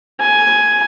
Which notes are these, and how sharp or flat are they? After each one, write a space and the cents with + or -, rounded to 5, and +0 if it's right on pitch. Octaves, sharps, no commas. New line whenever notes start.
G#5 +5